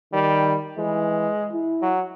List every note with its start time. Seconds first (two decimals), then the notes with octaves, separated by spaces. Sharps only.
0.13 D#3 G3
0.78 E3 G#3
1.53 E4
1.82 F#3